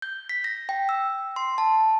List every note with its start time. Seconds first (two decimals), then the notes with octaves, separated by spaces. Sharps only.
0.02 G6
0.29 B6
0.44 A#6
0.69 G5
0.89 E6
1.36 C6
1.58 A5